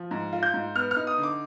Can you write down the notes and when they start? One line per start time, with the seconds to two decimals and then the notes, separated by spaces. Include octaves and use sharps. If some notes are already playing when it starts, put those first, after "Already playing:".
Already playing: F3
0.11 G#2
0.33 F4
0.43 G6
0.54 G#2
0.75 B3 F6
0.91 F6
0.96 D#4
1.07 D#6
1.18 D3
1.23 D6